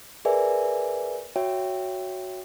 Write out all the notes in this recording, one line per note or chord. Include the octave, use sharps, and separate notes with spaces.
G#4 A#4 B4 D5 E5 G#5
F#4 C#5 E5 G5